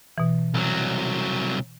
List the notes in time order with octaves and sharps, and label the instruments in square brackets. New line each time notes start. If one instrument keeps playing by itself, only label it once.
[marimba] B2 E3
[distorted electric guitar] C2 F#3